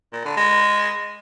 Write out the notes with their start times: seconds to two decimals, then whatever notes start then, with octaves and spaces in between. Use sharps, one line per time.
0.13 A#2
0.25 D3
0.37 G#3